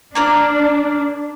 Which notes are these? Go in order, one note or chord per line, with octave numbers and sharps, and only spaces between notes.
A#3 D4 A#4 D5